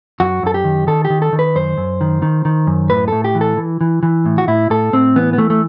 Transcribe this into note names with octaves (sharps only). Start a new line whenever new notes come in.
F#2 F#4
F#2 A4
G4
D#3
D#3 A4
G4
D#3
A4
D#3
B4
F#2 C5
F#2
D#3
D#3
D#3
F#2
A2 B4
A2 A4
G4
E3
A4
E3
E3
E3
A2
F#4
A2 E4
A2 A4
A2 C4
E3 B3
B3
E3 A3
A3